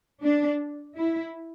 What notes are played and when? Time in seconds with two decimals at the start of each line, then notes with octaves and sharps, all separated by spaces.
0.23 D4
0.97 E4